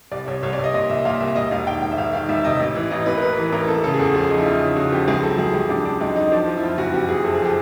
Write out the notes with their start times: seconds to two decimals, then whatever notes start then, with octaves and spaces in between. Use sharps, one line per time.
0.12 C2 D5
0.28 C2 C#5
0.43 C2 C#5
0.53 D5
0.59 C2 D#5
0.74 A#2 D#5
0.89 C2 E5
1.05 A#2 F5
1.20 C2 E5
1.35 E1 D#5
1.51 E1 F5
1.67 D#3 G5
1.82 E1 G5
1.91 E5
1.98 E1 F5
2.13 D#3 F5
2.29 E1 E5
2.44 C3 D#5
2.60 A1
2.75 E3
2.90 A1 D#5
3.06 A1 B4
3.17 A#4
3.22 E3 B4
3.32 B4
3.37 E3
3.43 B4
3.52 A1 A#4
3.68 A1 A4
3.84 C#3 A4
3.94 G#4
3.99 E2 A4
4.15 F3 G#4
4.30 F3 D#4
4.38 E4
4.45 E2 F4
4.61 C#3
4.76 C#3 F#4
4.92 F3 G4
5.08 C#2 G#4
5.23 F#3 A4
5.38 C#2 G#4
5.54 C#2 G4
5.69 C#2 D4
5.85 F#3 D4
6.00 C#2 D#4
6.16 F#3 D#4
6.31 F3 D4
6.47 F3
6.57 E4
6.62 F2 F4
6.78 F#1 F#4
6.93 F#1 G4
7.09 F#1 G#4
7.24 F2 A4
7.35 G#4
7.40 F3
7.45 G4